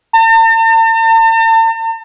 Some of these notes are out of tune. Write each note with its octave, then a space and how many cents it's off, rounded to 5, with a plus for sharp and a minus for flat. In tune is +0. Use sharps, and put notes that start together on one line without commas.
A5 +45